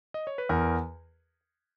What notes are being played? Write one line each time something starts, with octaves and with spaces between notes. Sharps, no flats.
D#5
C#5
B4
E2 A#4